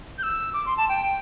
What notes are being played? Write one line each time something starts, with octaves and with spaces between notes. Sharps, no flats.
G6
E6
D6
C6
A5
G5